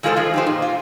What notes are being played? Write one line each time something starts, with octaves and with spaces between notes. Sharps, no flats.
D#3 G#3 F4 G#4 A4 C5
F3 G#3
D#4 G4 C5
A#2
F4